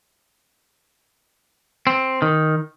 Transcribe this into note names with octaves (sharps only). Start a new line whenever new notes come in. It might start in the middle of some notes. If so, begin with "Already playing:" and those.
C4
D#3